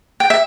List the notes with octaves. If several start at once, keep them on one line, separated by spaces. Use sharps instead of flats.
G5
E5